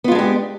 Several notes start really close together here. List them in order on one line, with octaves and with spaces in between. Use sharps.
B3 F4 G#3 D4 G4